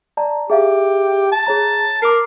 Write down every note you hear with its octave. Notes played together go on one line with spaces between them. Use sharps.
D5 A5 A#5
G4 G#4 E5 F5
A5
G#4 C#5 A#5
A#4 D6 C7